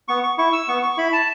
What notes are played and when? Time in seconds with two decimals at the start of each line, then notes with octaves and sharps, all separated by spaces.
0.08 B3 C#6
0.23 C#6
0.38 E4 C#6
0.53 E6
0.68 B3 C#6
0.82 C#6
0.97 E4 B5
1.13 A5